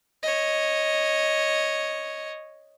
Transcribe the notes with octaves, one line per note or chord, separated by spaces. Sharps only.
C#5 D#5